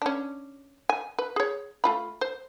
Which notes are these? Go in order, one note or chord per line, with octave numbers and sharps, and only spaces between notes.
C#4 D4
G#5
B4
G#4 C#5
A3 F4 B5
C5